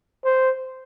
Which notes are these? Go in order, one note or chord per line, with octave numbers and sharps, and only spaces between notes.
C5